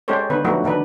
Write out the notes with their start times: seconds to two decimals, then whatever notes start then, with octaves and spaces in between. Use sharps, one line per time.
0.08 G#3 C#4 G4 A4 C5 C#5
0.30 D3 D#3 B3 B4
0.44 F3 F#3 A3 D4 D#4 F#4
0.64 D3 D#3 D4 B4